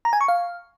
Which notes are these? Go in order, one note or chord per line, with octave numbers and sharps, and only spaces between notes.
A#5
G#5
C#6
F5